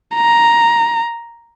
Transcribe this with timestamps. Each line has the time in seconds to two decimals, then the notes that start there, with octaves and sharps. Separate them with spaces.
0.16 A#5